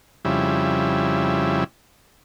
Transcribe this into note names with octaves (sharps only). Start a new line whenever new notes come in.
F2 C#3 G3 E4